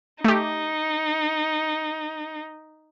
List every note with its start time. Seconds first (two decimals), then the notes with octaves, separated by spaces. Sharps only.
0.24 A3 D#4 G4